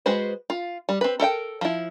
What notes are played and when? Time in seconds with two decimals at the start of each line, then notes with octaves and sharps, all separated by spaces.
0.06 G#3 F#4 B4 C5
0.50 F4
0.89 G3
1.01 C4 B4
1.20 A4 A#4 E5 G5
1.61 F3 E4